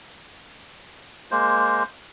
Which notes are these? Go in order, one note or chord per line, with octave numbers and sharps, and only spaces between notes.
G#3 A#3 C5